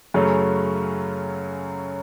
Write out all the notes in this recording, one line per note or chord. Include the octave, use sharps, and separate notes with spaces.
F#2 C#3 F#3 A3 C#4